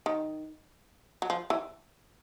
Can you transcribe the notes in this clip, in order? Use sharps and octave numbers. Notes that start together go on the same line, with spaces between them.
D#3
F#3
F3
E3